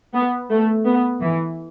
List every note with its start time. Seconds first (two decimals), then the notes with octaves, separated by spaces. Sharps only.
0.15 B3
0.50 A3
0.86 B3
1.21 E3